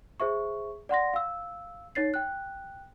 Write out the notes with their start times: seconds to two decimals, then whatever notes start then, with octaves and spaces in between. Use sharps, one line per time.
0.20 G#4 C5 E5 C#6
0.89 D5 F#5 C6 A#6
1.14 F5 E6
1.95 D#4 C#5 A6 C7
2.14 G5 F#6